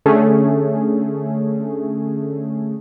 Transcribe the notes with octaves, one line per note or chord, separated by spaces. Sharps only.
D3 A3 C#4 G#4